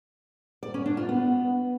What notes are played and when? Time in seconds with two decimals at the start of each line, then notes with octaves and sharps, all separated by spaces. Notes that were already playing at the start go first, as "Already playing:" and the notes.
0.63 D5
0.74 C#4
0.86 D4
0.97 F4
1.09 B3